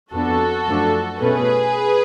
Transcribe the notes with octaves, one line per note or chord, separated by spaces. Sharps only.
F2 F3 B3 D4 F#4 A4
F#2 F3 A3 D4
B2 A3 C#4 G#4 B4